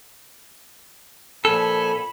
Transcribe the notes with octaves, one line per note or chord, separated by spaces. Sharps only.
A#2 F3 A4 G#5 B5